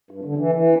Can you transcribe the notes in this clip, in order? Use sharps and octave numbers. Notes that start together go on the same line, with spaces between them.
G2
D3
E3
E3